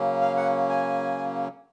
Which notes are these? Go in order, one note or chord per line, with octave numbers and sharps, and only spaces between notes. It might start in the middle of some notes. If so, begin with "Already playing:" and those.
Already playing: C#3 F#3 A#3 C#4
F5
F#5
G#5